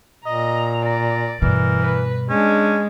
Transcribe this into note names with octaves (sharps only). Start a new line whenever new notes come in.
A#2 D#5 A#5
D5 A#5
G2 B2 E3 A#4
B4
G#3 C#4 D4